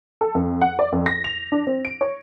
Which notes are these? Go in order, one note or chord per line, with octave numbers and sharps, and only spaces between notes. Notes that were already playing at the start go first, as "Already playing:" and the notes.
A4
F2
F#5
D5
F2
A#6
F7
D4
C4
D7
C#5